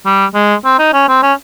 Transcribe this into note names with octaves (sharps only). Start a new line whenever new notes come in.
G3
G#3
C4
D#4
C#4
C4
C#4